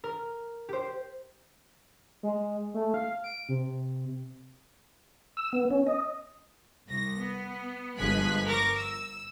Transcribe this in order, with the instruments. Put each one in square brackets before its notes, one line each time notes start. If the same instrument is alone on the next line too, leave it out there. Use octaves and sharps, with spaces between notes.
[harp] A#4
G4 C5
[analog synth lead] G#3
A3
F5
D7
C3
[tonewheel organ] E6
B3
C#4
D#5
[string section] C2 A#6
B3
G1 F3 G#3 G#5 F#6 B6
A#4 C#6 D6 A#6
E6